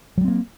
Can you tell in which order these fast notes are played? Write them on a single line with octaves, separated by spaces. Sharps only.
F#3 G3 C4 A#3